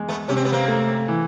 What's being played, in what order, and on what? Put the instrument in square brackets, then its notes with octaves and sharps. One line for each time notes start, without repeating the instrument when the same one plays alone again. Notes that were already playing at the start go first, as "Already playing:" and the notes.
Already playing: [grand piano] E2 G#3
[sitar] A3 B3
[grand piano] C3 [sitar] C#4
[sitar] C4
B3
A#3 C4
[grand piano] A3
E3